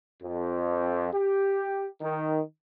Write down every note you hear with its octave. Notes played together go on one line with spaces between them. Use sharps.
F2
G4
D#3